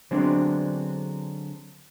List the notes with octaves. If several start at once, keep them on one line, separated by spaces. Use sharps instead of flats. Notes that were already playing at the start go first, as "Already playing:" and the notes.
D3 F#3 G#3 B3 C4 D4